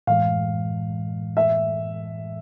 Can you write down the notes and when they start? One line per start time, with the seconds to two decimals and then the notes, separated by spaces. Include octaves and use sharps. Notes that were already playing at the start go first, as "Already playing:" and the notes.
0.07 A2 E3 G#3 F5
1.37 E5